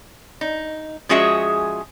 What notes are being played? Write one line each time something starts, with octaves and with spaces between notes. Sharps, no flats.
D#4
F3 G#3 C#4 F#4 G#4 E5